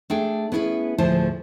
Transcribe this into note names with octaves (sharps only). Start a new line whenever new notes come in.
A3 D4 G#4 G5
B3 C#4 E4 G#4 B4
D2 A2 F3 G#4 C5 A5